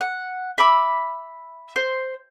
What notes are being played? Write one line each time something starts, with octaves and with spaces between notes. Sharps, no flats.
F#5
E5 B5 D6 E6
C5